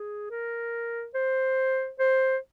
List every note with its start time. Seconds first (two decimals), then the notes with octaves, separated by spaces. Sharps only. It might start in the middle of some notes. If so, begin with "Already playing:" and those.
Already playing: G#4
0.30 A#4
1.14 C5
1.99 C5